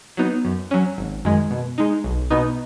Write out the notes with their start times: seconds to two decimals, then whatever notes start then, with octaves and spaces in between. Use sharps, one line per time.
0.17 F#3 B3 D#4
0.45 F#2
0.71 F#3 C#4
0.98 G#1
1.25 F#2 D#3 G#3
1.51 B2
1.78 G#3 D#4
2.04 B1
2.30 B2 B3 D#4